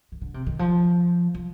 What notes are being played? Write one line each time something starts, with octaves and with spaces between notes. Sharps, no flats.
D#3
D3
C3
D#3
F3
F3